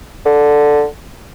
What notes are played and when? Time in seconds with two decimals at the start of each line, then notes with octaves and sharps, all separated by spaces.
0.25 D3